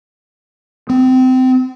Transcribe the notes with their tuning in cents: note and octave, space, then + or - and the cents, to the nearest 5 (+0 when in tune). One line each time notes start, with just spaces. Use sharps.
C4 -25